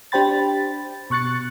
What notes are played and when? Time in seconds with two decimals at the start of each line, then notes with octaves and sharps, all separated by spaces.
0.12 D4 G4 C5 G5 B5 A6
1.10 B2 C#6 F#6 A6 C#7